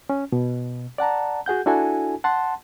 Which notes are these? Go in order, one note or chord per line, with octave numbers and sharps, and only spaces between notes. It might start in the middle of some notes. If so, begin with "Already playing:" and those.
C#4
B2
D5 F#5 A5 A#5
F#4 G#4 F#5 G6
D4 E4 F#4 A4 G#5
F#5 A5 C6